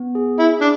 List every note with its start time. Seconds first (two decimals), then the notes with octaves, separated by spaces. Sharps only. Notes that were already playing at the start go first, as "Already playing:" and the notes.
Already playing: B3
0.15 G#4
0.39 E4 G#4
0.61 D4